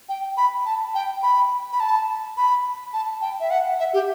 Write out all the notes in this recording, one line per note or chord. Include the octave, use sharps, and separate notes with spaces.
G5
B5
A5
G5
B5
B5
A5
B5
A5
G5
E5
F#5
E5
G4